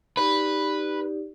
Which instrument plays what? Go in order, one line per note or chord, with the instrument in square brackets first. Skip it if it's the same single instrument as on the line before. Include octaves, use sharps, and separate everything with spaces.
[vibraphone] D#4 G4 D5 [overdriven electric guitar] B4